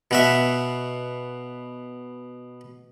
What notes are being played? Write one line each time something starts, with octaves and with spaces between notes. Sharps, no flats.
B2 F#4 E5